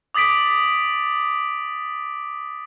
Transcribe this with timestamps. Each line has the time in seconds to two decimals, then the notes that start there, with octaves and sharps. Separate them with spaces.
0.14 D6 D#6 A6 B6 D7